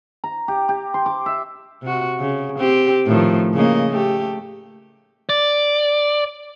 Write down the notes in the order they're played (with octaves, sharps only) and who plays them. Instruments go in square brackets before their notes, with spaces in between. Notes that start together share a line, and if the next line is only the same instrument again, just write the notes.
[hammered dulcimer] A#5
G4
G4
C6
D6
E5
[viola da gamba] C3 F#4
C#3
C4 G4
A2 D#3 F3
C#3 A#3 D#5
A3 G4
[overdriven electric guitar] D5